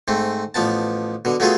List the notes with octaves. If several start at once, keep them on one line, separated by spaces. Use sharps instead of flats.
G#2 A3 C4
A1 F3 B3 A5
B2 D3
F#3 A3 B3 F4 G#4 A4